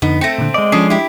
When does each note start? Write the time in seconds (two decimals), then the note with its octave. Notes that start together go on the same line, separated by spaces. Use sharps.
0.02 F2 D3 B3 D#4
0.21 A3 C4 A#6 C#7
0.38 A#2 D3
0.54 G#3 D5 D#5
0.72 F3 C#4 D4 D#6 C7
0.90 E4 G4